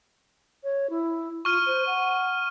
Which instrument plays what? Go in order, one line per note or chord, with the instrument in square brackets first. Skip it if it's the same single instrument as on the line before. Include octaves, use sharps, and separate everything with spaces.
[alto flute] C#5
E4
[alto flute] F4 [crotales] C#6 F6 D#7
[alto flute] C5
F#5